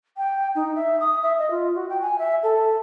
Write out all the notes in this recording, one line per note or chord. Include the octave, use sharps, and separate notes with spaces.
G5
D#4
E5
D#6
E5
D#5
F4
F#4
G5
G#5
E5
A4